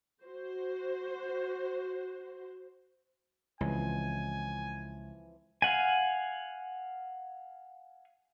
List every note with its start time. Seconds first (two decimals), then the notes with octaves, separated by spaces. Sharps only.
0.23 F#4 C5
3.61 C#2 E3 F3 C4 G#5
5.62 F5 F#5 G#5